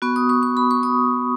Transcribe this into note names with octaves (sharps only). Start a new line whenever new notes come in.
B3 F#4 C#6
D#6
C#6
C#6
B5
C#6
D#6